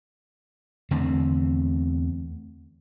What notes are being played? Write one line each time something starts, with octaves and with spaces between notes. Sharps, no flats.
E2 D3 A3 C4